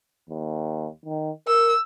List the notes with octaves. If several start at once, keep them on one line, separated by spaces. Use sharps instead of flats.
D#2
D#3
A#4 E6